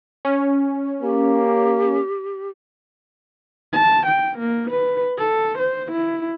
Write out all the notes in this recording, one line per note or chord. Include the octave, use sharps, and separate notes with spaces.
C#4
A#3 G4
A5
G5
A#3
B4
A4
C5
E4